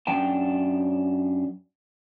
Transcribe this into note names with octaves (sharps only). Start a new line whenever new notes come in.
F#2 D4 G5 A5